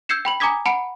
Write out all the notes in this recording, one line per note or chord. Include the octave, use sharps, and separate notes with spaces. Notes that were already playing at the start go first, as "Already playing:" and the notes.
E6 G6 G#6 C7 C#7 E7
G5 B5 F#7
G#5 A#5 D6 D#6 G#6 B6
F#5 A5 B5 C#7 D7